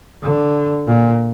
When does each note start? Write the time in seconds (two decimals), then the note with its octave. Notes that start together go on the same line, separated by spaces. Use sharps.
0.23 D3
0.87 A#2